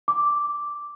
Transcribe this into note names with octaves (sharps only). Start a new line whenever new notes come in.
D6